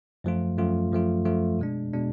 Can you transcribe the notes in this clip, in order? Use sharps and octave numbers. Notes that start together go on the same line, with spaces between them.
F#2 F3 A3 F4
F#2 F3 A3 F4
F#2 F3 A3 F4
F#2 F3 A3 F4
B2 G#3 D4
B2 G#3 D4